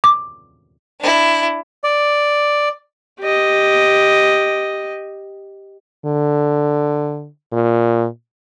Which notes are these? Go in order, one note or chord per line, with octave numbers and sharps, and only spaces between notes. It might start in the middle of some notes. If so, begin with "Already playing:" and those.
D6
D4 E4
D5
G4 D#5
D3
A#2